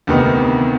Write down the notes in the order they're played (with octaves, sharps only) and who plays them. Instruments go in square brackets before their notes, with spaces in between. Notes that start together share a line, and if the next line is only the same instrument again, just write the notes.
[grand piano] D2 C3 D#3 B3 D#4